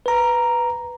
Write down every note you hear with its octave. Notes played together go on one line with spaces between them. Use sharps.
B4 A#5